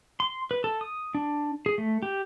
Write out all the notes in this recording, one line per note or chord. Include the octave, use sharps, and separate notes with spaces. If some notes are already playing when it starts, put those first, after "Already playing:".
C6
B4
A4
D#6
D4
G#4
A3
G4